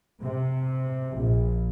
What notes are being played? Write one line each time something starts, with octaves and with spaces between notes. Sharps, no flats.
C3
A#1